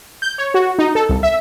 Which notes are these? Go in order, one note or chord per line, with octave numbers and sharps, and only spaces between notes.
G6
C#5
F#4
D#4
A4
C2
E5